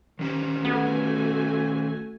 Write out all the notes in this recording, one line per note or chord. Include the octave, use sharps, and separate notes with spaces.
D#3 C#4 G4
A3 B3 F#4 G#5